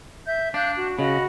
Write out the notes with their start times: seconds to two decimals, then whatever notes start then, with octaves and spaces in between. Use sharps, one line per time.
0.26 E5 G6
0.54 D4 F5 F#6 G6
0.75 F#4
0.99 C#3 F#4 D#5 B5